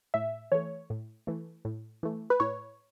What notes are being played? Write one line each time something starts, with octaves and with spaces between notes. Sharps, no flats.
A2 E5
E3 A3 C#5
A2
E3 A3
A2
E3 A3
B4
A2 C#5